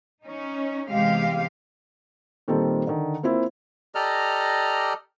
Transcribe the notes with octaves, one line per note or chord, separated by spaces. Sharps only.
C#4 D#4
E2 C3 G#3 G4 F5
A#2 D#3 G3 C4 A4
D3 D#3
A#3 C4 E4 F4
G4 A4 D5 D#5 A#5 F6